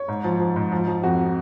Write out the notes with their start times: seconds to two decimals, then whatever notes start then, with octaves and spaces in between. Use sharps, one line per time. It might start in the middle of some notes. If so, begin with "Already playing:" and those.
Already playing: C#5
0.08 G#2
0.24 F3
0.40 F3
0.56 G#2
0.72 F3
0.88 F3
1.03 F2 F#4